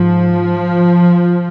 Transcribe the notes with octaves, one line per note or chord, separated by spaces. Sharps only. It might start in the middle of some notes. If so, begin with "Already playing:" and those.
Already playing: G#2 F3